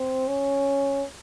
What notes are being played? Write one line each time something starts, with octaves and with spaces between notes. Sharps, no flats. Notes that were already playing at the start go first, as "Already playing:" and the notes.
Already playing: C4
C#4